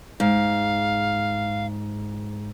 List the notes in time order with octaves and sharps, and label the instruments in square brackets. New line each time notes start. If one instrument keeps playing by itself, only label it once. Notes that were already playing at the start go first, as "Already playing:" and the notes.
[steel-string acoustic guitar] G#2 [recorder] F5